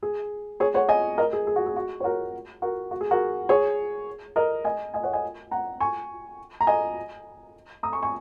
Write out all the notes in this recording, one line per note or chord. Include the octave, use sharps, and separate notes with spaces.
G#4
G#4 C#5
C#5 F#5
D#5 G#5
A#4 D#5
G#4
G#4
F#4
G#4
F#4
C#5
F#4 A#4
F#4 A#4
F#4
G#4
F#4 A#4
G#4 C#5
A#4 D#5
D#5 G#5
D#5 G#5
C#5 F#5
D#5 G#5
F#5 A#5
G#5 C#6
A#5
D#5 G#5
A#5 D#6
G#5 C#6
G#5 C#6